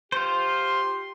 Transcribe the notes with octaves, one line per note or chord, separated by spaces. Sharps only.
F4 G4 C5 C6